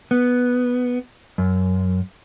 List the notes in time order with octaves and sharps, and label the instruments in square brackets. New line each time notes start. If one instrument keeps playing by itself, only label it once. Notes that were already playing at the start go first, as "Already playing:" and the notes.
[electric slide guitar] B3
F#2